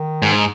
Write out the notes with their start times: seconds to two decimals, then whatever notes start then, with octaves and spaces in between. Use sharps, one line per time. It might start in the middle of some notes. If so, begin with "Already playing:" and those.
Already playing: D#3
0.22 G#2
0.34 D#4